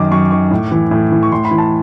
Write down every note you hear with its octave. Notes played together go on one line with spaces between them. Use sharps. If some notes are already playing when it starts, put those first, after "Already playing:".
Already playing: F#2 D#3 D6
F#2 C#6
D#3 C#6
A2
E3
A2
E3
C#6
A2 C6
B5
E3
A5